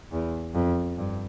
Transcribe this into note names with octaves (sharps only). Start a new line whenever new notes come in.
E2
F2
G2